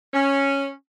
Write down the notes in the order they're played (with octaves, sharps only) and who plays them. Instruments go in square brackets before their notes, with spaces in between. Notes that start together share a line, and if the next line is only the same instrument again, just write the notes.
[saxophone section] C#4